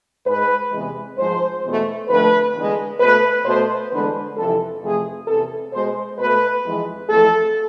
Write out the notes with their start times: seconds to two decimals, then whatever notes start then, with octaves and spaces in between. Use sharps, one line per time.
0.26 G#2 G#3 B4
0.73 E2 C3 E3 G#3
1.17 G#2 F3 G#3 C5
1.63 E2 B2 A3
2.09 F2 D3 A3 B4
2.54 E2 D3 G#3
3.00 B2 A3 B4
3.45 B2 A3 C5
3.91 E2 D3 G#3 B4
4.37 F2 C3 E3 A4
4.82 F2 C3 E3 A3 G#4
5.28 E2 C3 E3 A4
5.73 B2 G#3 C5
6.19 B2 A3 B4
6.65 F2 E3 G#3
7.10 F2 E3 A3 A4